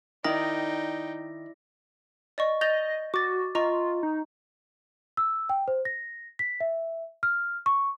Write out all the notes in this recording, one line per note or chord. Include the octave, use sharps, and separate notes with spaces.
D#3 D#4 E4 D5 G5 A#6
D5 D#5 C#6
D#5 G6 A6 F7
F#4 D6 A6
F4 D#5 A#5 C#6
D#4
E6
G5
C5
A#6
B6
E5
F6
C#6